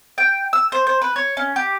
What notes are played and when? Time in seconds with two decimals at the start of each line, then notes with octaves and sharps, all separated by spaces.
0.18 G5
0.53 E6
0.72 C5
0.87 C5
1.02 B4
1.16 C#5
1.37 C#4
1.56 G4